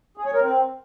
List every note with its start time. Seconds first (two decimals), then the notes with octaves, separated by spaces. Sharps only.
0.17 G#4
0.25 C#5
0.33 A#4
0.41 C4